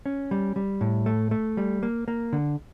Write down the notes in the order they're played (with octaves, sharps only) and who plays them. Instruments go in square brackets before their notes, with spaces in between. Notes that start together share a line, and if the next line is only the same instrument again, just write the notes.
[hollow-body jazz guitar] C#4
G3
G3
A2
A3
A3
G3
A#3
A#3
D3